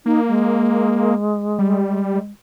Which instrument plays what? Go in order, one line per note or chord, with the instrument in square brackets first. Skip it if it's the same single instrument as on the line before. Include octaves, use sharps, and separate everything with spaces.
[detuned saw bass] A#3 [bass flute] D#4
[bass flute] G#3
[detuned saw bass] G3